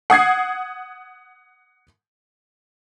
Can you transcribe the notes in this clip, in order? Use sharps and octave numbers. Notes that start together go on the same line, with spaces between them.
F#5 D#6 G#6 C7